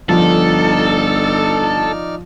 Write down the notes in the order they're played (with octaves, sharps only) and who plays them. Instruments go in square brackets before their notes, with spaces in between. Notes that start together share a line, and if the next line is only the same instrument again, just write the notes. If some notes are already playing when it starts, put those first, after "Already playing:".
[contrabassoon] G1 [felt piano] F3 [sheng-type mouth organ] D#4 D5 F6 [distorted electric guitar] A4